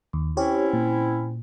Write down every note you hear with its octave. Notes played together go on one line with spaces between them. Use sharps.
D#2
C4 C#4 E4 G4 C#5
A#2